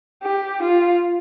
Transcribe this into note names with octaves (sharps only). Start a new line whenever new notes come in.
G4
F4